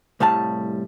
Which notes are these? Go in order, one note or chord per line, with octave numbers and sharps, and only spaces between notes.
C2 A2 G3 F5 A5